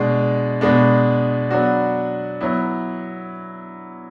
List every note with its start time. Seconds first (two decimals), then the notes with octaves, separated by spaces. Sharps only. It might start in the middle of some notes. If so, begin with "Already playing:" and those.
Already playing: B2 G#3 D4
0.61 B2 G#3 B3 D4
1.50 F#3 B3 D4 F#4
2.41 F#3 B3 E4